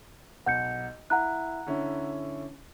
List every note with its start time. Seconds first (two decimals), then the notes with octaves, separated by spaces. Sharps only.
0.46 B1 F#5 G6 C#7
1.10 E4 F#5 A#5 F#6
1.66 D3 C#4 E4